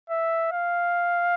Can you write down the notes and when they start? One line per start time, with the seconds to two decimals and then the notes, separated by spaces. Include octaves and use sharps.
0.10 E5
0.52 F5